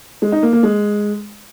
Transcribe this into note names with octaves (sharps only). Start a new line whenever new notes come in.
G#3
D#4
A#3
A#3
G#3